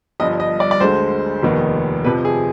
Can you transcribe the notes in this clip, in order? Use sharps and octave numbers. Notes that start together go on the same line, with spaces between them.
G1 G2 F3 D#5
D#5
D5
D5
D2 D3 G#3 C5
F1 D#2 D#3 B3
F2 C3 F3 B4
G#4